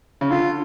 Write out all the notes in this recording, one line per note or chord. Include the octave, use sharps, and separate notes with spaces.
C#3
D3 F4